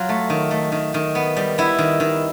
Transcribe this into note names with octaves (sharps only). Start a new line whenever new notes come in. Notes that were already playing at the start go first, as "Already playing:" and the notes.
Already playing: F#3 F4
A3
D#3
A3
D#3
D#3
B3
G3
B3 E4
D#3
D#3